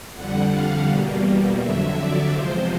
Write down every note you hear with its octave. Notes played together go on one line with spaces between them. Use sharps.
F2 D3 G3 F#5
F5
E2 B2 G3 A#3
F2 D3 F#3 E5
D5
E2 C3 F3 G#3 C5